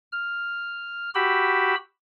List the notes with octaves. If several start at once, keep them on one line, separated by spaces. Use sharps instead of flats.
F6
F#4 G4 B5 E6